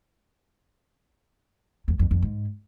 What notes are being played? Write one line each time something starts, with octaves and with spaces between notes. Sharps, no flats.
E2
F2
F2
G#2